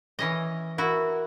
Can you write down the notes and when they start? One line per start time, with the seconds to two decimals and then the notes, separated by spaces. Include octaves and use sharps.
0.19 E3 C#4 D#5
0.78 E4 F#4 A#4